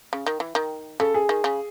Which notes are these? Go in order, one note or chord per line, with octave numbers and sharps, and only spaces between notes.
C#3
D#3
E3
D#3
C#3 A4
G#4
D#3
C#3